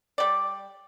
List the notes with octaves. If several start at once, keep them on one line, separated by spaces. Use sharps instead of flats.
G3 D5